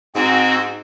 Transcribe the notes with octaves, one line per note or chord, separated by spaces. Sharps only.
G#2 C4 F#4